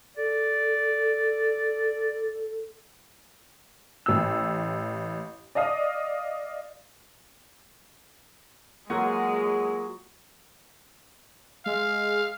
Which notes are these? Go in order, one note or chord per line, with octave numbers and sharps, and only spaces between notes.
A4 D5
A1 E6
D5 D#5 F5 D#6
F#3 G#3 A#3 F4 F#4 G#4
G#3 F5